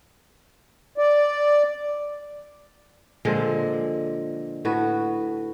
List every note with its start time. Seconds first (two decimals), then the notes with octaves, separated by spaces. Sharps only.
0.98 D5
3.25 A#2 D3 F3 G#3
4.65 A2 F#4 B4